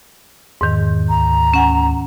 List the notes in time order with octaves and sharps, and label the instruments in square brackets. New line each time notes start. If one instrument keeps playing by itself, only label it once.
[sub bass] E2 [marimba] G#2 D#3
[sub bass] D2 [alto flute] A#5
[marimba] C#4 F#5 G#5